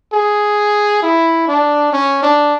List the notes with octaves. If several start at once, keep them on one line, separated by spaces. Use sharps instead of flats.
G#4
E4
D4
C#4
D4